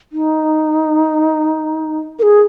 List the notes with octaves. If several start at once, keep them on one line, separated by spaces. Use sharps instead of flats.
D#4
A#4
G#4